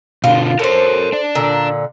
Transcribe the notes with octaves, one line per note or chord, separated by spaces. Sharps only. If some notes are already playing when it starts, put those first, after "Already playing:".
B2 D3 F4
A4 A#4 C5 C#5
D4 D5
A#2 D3 A#5